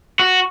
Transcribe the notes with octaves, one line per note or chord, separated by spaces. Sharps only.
F#4